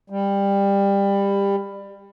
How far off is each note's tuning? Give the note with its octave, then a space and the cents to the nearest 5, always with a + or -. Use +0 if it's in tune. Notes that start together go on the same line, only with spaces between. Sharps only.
G3 +20